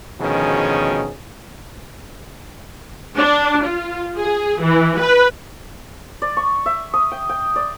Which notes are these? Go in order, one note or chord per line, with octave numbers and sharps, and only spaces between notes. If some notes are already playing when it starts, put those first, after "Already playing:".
D2 B2 D#3 F3 C#4 G#4
D4
F4
G#4
E3
B4
D5
C#6
E5
D#6
G5
G5
D5